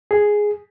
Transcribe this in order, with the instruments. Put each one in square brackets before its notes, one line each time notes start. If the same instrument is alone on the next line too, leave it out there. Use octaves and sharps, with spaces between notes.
[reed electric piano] G#4